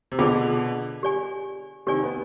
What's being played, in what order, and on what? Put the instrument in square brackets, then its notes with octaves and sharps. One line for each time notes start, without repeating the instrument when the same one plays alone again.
[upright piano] C3
[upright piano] B2 D3 [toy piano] F4 G#4 B4 D5
[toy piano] G4 D5 G#5
[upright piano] C3 D#3 [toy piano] G4 D5 G#5
[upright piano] B3